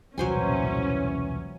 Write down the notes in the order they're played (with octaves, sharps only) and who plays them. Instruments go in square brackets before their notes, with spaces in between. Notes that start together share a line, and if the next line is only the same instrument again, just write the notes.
[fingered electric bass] E1 C2 [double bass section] A#2 E3 [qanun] F#3 C5 G#5 [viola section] C#4